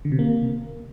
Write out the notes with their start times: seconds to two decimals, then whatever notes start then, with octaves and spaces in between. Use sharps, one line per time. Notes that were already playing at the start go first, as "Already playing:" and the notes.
0.05 D3
0.12 C3
0.19 A#3